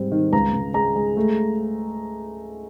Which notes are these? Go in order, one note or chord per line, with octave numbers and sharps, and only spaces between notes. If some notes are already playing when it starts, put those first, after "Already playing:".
Already playing: G#2 G3 C4
D#3
C#2 A#5
C#2
G#3 A#5
G#3
A3